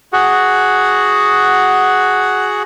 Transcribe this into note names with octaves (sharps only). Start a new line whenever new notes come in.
F#4 G#4 F#5